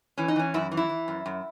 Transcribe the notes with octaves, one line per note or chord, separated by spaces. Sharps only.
E3 C#4
D#4
E3 C#4
F#2 E4
E3
E4
E3
F#2
F#2